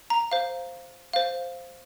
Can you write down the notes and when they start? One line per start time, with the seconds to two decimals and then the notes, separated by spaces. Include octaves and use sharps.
0.10 A#5
0.31 C5 F5
1.13 C5 F5